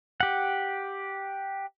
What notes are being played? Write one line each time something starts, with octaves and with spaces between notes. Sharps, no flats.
G4 F#5